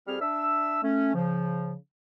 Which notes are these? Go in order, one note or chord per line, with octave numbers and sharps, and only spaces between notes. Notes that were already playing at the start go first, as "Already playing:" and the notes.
F2 G3 C4 G#4 F6
D4 E5 E6
A3 C#4
C#3 F3